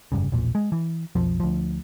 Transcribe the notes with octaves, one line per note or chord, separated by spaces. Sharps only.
F1 A#1 G2 C#3
E1 A#1 A#2
G#3
E3
B1 F2 F3
D2 F3